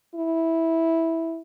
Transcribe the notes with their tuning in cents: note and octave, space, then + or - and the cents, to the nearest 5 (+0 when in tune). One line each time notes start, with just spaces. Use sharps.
E4 -10